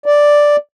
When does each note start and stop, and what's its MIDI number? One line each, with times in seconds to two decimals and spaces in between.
0.06 0.56 74